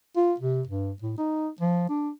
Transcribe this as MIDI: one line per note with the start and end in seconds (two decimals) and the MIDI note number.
0.17 0.34 65
0.40 0.62 48
0.67 0.92 43
1.02 1.13 45
1.17 1.48 63
1.61 1.85 53
1.89 2.10 62